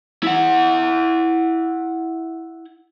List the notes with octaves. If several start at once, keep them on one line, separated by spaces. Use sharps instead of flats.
E4 F#5